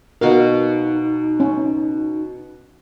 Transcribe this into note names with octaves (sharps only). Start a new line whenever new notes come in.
B2 D#4 F#4 A#4 F5
C#4